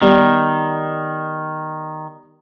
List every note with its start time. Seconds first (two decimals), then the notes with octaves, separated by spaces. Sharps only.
0.02 B2 D#3 G3